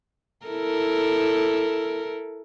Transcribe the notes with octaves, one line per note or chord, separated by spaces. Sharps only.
E4 A4 A#4